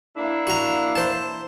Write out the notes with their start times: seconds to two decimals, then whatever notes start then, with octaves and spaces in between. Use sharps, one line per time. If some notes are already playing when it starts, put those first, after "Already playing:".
0.17 A#3 D4 E4
0.47 F#4 A#5
0.95 C5 A5